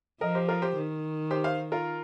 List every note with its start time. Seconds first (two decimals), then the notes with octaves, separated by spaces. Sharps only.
0.21 F3 A#4 D#5
0.35 G4 C5
0.48 F4 A#4
0.62 G4 C5
0.76 D#3
1.31 G4 C5
1.44 C5 F5
1.72 F4 A#4